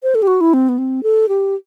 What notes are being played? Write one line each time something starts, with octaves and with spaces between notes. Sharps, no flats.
C5
A4
G4
F#4
E4
C4
B3
C4
A4
G4